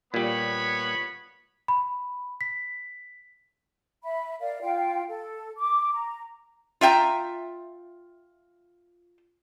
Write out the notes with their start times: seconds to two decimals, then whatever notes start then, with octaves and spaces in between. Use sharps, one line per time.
0.14 A#2 G3 B3 C#5 B5
1.68 B5
2.41 B6
4.03 E5 B5
4.41 A#4 D5 F5
4.62 F4 F5 G5
5.08 A4
5.58 D6
5.94 A#5
6.81 F4 E5 G5 A#5